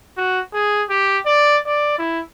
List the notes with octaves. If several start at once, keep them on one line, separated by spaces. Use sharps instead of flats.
F#4
G#4
G4
D5
D5
E4